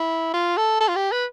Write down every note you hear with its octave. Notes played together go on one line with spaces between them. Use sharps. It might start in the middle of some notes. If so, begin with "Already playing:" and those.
Already playing: E4
F4
A4
A4
F4
G4
B4